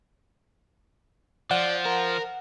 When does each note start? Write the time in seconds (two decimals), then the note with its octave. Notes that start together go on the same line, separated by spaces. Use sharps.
1.51 F3 D5 F#5
1.86 A#4